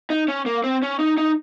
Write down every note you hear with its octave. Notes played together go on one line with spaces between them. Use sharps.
D#4
C#4
A#3
C4
C#4
D#4
D#4